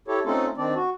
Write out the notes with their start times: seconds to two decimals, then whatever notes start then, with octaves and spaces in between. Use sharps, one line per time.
0.08 E4 G4 A4 C#5
0.25 A3 C4 C#4 D#4 F4 A4
0.58 D#3 C4 D4 D5
0.75 F#4